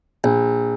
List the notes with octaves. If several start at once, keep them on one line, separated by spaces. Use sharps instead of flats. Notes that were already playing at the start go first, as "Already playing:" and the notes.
A#1